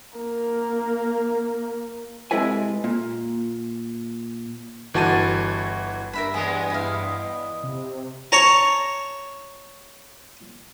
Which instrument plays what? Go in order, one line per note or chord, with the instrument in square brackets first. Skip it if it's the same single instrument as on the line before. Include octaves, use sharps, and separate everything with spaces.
[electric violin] A#3 A#4
[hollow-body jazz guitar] C3 G#3 E4 A4 B4 G#5
A#2
[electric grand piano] G1 E3 F#4 A5 A6 D#7
[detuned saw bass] G2 [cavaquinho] A#4 E5 B5
[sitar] E2 G#3 B3 [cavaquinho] G#4 [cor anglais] D#5
[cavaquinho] E4 F5
[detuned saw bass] C3
[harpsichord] C#5 A5 A#5